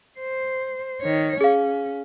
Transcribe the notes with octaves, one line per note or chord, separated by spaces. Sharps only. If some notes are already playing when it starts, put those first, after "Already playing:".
C5
D#3 C#5
C#4 G#4 F5